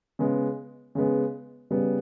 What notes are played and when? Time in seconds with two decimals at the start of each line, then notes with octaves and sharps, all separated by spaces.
0.19 C#3 G#3 B3
0.95 C#3 G#3 B3
1.71 C#3 G3 B3